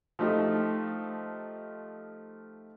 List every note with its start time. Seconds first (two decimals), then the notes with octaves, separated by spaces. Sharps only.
0.19 F3 A3 D#4 G4